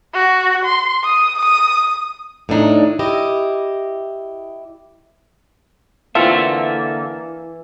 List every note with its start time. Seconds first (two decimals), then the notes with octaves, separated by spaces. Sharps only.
0.14 F#4
0.65 C6
1.04 D#6
1.38 D#6
2.49 A2 D#3 D4 D#4
2.99 E4 G4 D#5
6.15 D3 E3 A#3 C4 E4 F4 A4 E5